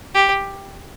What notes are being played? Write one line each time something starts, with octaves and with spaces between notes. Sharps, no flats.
G4